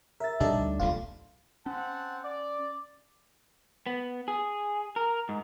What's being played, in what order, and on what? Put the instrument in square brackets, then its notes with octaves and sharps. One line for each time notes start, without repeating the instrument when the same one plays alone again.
[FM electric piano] A#4 [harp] E5 A6
[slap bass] A#1 D3 [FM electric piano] G3 D#4 A4 [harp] D4
[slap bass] D2
[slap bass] D#1 B1 [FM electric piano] A3 F4
[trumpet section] C4 F#5 A5 [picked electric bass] C#4
[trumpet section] D5
[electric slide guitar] B3
G#4
A#4
G#2